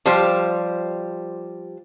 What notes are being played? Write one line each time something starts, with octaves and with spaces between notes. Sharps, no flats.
F3 G3 G4 C5